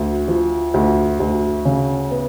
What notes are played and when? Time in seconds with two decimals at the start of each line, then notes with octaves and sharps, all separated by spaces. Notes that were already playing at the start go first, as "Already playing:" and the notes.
Already playing: D2
0.28 F3
0.74 D2
1.20 D2
1.65 C#3
2.11 B3